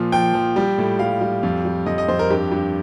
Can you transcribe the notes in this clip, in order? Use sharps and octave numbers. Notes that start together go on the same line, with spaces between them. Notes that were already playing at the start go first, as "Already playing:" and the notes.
Already playing: A#2 F3
F3 G5
F3
G3
A2
G3 F5
G3
F2
G3
F2 D#5
D#5
F2 C5
A#4
G2 G4
G2